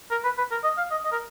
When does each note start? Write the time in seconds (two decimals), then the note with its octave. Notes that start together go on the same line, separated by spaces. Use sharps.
0.11 A#4
0.24 B4
0.38 B4
0.51 A#4
0.64 D#5
0.77 F5
0.91 D#5
1.04 D#5
1.12 A#4